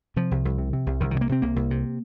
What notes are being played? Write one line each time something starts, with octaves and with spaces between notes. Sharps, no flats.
C3 F3
C2
C2
C3
C3
C2
C2 D#3
C3 D#3
A#3
C3 C4
C2 A#3
C2
C3